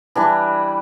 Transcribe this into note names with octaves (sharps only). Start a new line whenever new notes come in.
E3 G3 D4